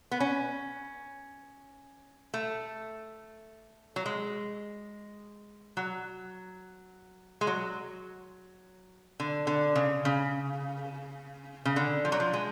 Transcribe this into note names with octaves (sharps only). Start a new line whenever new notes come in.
B3
C#4
A3
F#3
G#3
F#3
G#3
F#3
D3
D3
C#3
C#3
C#3
D3
F3
F#3
F3
G#3